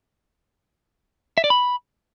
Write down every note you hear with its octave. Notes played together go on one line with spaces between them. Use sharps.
E5
D5
B5